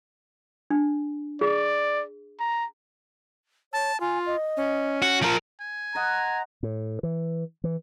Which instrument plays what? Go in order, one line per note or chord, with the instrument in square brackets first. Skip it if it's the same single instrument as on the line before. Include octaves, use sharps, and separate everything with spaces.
[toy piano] D4
[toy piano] G#4 [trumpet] D5
[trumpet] A#5
[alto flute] C#5 [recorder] A5
[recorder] F4 [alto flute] G#5
[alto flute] D#5
[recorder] C#4
[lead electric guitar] F#4
F3 A#4
[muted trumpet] G#5
[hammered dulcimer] C5 D#5 F#5 [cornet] A#5
[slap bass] A2
E3
E3